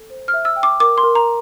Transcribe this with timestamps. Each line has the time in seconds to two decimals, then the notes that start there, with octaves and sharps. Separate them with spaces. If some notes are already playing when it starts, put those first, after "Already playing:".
Already playing: A4
0.10 C5
0.28 F6
0.34 E5
0.45 E6
0.56 G5
0.63 D6
0.80 A#4 D6
0.98 C6
1.03 A#4
1.15 A#5